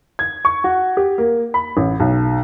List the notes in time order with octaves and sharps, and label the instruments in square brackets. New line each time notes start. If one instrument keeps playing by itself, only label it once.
[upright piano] G#6
C#6
F#4
G4
A#3
B5
A1
B1